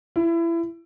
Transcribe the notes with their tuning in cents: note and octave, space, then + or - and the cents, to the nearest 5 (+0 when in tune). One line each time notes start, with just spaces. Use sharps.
E4 +25